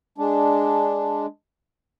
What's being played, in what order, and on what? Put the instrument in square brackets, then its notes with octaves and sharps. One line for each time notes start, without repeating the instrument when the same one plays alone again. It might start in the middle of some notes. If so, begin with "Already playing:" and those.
[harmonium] G#3 D4